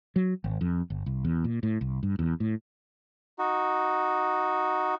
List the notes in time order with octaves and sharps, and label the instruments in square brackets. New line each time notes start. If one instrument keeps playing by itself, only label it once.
[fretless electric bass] F#3
G#1
F2
G1
C2
E2
A#2
A2
C2
G2
E2
A2
[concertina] D#4 F#4